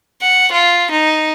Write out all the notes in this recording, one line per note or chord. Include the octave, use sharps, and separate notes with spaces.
F#5
F4
D#4